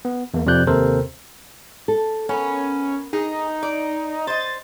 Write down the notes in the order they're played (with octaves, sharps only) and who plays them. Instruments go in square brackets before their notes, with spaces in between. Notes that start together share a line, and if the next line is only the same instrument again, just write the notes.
[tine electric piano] B3
E2 A#3
F2 C3 F3 D5 F#6 G6
D#2 C3 A4 A#4 C5
[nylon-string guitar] A4
[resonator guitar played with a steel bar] B3 [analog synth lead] C#4 [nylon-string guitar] A#4
[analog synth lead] D#4 [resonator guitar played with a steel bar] G#4
[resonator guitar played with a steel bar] D5
[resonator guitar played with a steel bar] C5 D#5 [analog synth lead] A6